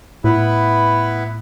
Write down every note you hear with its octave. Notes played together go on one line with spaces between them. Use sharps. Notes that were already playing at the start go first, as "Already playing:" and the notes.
A2 B3 E4 B4